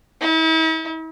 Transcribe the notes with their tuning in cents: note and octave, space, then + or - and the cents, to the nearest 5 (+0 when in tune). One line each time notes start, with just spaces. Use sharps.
E4 -45